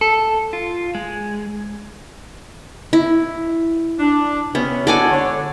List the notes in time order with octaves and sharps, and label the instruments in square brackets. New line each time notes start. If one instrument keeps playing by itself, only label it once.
[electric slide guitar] A4
F4
G#3
[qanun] E4
[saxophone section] D4
[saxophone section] C3 C#4 [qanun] B3
[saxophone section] G#3 D4 F#4 [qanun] A4 D5 G#5
[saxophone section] D3 C#5